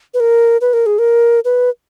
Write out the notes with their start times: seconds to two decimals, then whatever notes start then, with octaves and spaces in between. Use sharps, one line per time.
0.14 B4
0.20 A#4
0.61 B4
0.73 A#4
0.86 G#4
0.98 A#4
1.45 B4